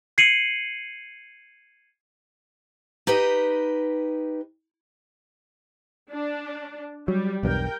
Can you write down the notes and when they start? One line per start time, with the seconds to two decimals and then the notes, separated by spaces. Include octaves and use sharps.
0.18 G#6 C7 C#7 D#7 F#7
3.07 D#4 G4 B4 D#5
6.10 D4
7.08 F#3 G3
7.43 B1 E2 G2 A#4 G5